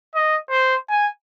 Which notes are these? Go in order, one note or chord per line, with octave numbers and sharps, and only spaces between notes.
D#5
C5
G#5